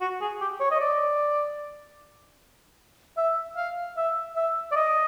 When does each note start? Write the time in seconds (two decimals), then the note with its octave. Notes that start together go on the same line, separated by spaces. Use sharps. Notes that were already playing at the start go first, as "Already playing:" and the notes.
0.01 F#4
0.21 G#4
0.41 G4
0.60 C#5
0.71 D#5
0.80 D5
3.17 E5
3.56 F5
3.97 E5
4.36 E5
4.71 D5
4.76 D#5